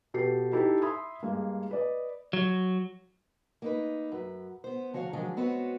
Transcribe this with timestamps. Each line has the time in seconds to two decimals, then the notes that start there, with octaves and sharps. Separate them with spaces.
0.14 B2 B3 G4 A4 C7
0.52 D#4 E4 G4 A4
0.82 E5 B5 C6 D#6 G#6
1.23 G2 G#3 A#3
1.71 B4 D5 D#5
2.33 F#3
3.62 A#3 D#4 B4
4.12 F#2 B4
4.64 B3 C5
4.93 D2 F3 F#4 C#5 D5 F5
5.13 D#3 F3 F#3 G#3 D4
5.36 G#3 B3 C4 F#4 B4 C#5